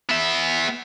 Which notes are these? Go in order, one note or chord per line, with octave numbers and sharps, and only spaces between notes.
B3 E5